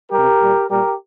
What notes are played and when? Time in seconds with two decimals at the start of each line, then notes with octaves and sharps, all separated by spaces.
0.11 C3 G3 G4 A#4
0.41 A#2 G3
0.69 A#2 G3 G4 A#4